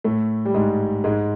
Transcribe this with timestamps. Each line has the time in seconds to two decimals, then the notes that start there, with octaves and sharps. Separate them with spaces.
0.04 A2 A3
0.45 G3
0.54 G#2 G#3
1.04 G#2 G#3